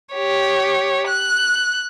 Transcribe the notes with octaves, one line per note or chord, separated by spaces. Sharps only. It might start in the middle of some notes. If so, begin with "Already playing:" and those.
G4 C#5
F#6